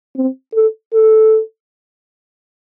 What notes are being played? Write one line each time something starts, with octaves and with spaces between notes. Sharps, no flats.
C4
A4
A4